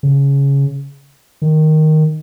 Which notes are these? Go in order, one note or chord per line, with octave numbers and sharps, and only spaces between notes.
C#3
D#3